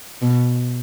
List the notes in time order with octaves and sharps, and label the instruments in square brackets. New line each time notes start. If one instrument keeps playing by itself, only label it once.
[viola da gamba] B2